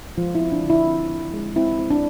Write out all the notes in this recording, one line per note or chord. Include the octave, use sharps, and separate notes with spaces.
F3 G#3 F4
E4
C4
D4
D3
E4
C4
C4
G#3
C4 E4
C4
D4